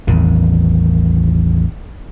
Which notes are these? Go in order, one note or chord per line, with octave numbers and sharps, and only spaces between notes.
A1 E2 D#3